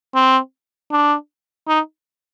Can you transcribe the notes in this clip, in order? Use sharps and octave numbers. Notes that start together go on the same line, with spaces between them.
C4
D4
D#4